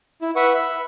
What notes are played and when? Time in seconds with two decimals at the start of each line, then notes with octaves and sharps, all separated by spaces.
0.22 E4
0.36 B4 E5 F#5 C#6
0.54 E5 B5